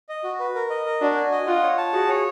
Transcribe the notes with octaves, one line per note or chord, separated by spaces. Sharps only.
D#5
F#4
B4
A#4
D#5
A#4
D4 F#4
G#5
D#5
F4 F#5
C#5
A5
F#4 G#4
C#5